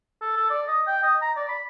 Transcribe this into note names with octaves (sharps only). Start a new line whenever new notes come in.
A4
A4
D5
D#5
G5
D#5
A#5
D5
B5